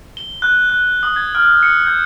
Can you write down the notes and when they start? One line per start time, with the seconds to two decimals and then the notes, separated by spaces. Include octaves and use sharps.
0.17 G7
0.42 F#6
0.70 F#6
1.03 D#6
1.16 G#6
1.35 F6
1.63 C#7
1.86 G6